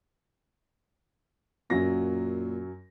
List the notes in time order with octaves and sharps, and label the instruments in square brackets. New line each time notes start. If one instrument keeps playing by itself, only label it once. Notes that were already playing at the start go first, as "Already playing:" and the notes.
[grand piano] F#2 F#3 A#6 [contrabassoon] A#2